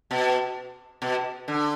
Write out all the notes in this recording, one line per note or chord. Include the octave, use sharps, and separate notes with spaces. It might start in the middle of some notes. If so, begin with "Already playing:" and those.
B2
B2
D3